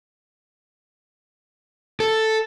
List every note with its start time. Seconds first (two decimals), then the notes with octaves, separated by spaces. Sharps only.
2.00 A4